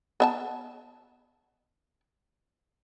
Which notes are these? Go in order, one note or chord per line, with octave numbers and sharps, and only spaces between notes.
B3 E5 A5